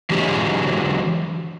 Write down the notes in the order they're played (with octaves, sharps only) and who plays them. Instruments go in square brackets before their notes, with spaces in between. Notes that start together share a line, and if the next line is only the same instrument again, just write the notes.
[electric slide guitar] D3 E3 F#3 G#3 G4